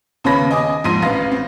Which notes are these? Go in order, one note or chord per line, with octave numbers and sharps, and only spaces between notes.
D#2 C#3 B4 C#5 B5 A#6
D#5 G#5 D6 D#6
A#1 F2 G#2 C6 A#6 D#7
A1 B4 F5 A#6
C4